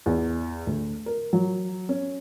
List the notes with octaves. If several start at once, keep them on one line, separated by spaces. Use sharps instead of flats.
E2
D2
A#4
F#3
C#4